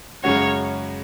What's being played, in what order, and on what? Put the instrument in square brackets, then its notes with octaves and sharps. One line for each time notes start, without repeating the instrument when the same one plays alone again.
[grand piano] F#2 C#3 G#3 C#4 F#4 [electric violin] C#5